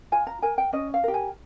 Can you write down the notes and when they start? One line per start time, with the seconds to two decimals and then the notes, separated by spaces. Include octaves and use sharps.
0.12 F4 G#5
0.27 A#5
0.42 A#4 G#5
0.58 G5
0.73 C#4 D#5
0.94 F5
1.04 G4 A#4
1.14 G#5